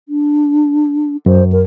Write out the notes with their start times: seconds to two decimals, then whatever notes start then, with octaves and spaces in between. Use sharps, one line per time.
0.09 D4
1.26 F#2 C5
1.52 A#4